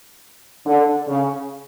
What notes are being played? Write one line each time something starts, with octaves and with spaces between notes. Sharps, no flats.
D3
C#3